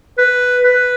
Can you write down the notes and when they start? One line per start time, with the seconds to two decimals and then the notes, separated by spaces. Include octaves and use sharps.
0.18 B4
0.64 B4